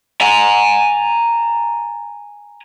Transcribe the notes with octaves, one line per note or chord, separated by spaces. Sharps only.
G#5 A#5